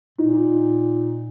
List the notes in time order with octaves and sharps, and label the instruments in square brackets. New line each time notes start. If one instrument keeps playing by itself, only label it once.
[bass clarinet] A#2 [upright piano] D#4